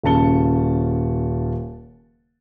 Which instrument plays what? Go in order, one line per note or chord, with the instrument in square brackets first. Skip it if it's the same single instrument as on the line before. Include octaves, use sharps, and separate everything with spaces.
[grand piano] D#1 C#3 C#4 A5 C#7 G7